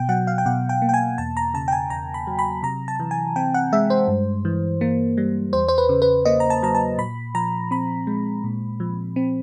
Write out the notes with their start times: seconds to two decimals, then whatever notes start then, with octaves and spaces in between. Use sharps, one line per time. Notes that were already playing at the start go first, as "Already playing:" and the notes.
Already playing: B2 G5
0.09 F#3 F#5
0.27 F5
0.38 G5
0.46 B2 F#5
0.69 G5
0.82 A#3
0.89 G5
0.94 G#5
1.18 E2 A5
1.37 A#5
1.54 C#3 A5
1.68 G5
1.72 G#5
1.90 E2 A#5
2.14 B5
2.27 F#3
2.39 B5
2.63 C3 A#5
2.88 A5
3.00 E3
3.11 G#5
3.36 C4 G5
3.54 F#5
3.72 G#3 E5
3.90 C5
4.08 G2
4.45 E3
4.81 A#3
5.17 G3
5.53 E2 C5
5.68 C5
5.78 B4
5.89 C#3
6.02 B4
6.25 A#3 D#5
6.40 A#5
6.50 A5
6.63 F#3 A#5
6.75 A5
6.98 A#2 B5
7.35 F3 A#5
7.71 C4 B5
8.07 G#3
8.44 A#2
8.80 F3
9.16 C4